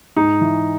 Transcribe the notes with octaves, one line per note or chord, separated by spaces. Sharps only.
G#2 D#4
E3